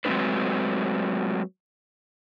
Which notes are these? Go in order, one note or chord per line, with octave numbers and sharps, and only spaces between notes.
F#3 G#3 A3 C4 D4 B4